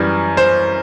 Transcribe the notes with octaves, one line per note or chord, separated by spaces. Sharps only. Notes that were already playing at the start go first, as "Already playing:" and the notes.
Already playing: F#2 E3 G3
C5